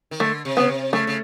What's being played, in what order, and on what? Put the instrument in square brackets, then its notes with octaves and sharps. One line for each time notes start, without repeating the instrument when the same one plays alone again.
[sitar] D#3
[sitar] D3 [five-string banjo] A3
[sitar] C3
[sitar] C#3 [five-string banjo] B3
[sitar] C3
[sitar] C#3 [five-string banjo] A3
[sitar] C#3